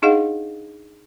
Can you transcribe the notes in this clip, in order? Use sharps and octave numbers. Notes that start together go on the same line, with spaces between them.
D4 D#4 G#4 D#5 F5 F#5